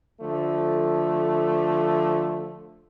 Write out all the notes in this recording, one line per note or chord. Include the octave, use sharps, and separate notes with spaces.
D3 F3 A3